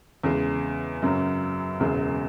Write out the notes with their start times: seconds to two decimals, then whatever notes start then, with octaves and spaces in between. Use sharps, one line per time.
0.24 E2 C#3 G#3
1.02 F#2 C#3 F#3
1.80 E1 E2 C#3 G#3